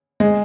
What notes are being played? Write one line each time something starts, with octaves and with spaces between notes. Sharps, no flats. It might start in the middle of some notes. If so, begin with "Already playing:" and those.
G#3